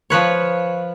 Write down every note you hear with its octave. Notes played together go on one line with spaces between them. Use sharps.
F3 B4 C#5